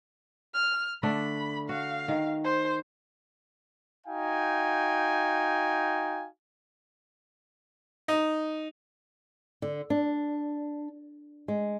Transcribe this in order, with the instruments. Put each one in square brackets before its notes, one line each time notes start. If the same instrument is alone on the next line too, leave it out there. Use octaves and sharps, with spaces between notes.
[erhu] F6
[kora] D3 A3 D4 [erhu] B5
[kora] F#4 [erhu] F5
[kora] D#3
[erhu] C5
[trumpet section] D#4 F#4 F5 G5 G#5
[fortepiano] D#4
[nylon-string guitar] D3
D4
G#3